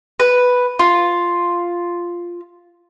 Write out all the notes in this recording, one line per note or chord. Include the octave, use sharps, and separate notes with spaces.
B4
F4